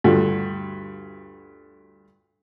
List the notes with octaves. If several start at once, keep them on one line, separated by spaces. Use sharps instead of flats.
D2 G2 A3 F4 F#4 G5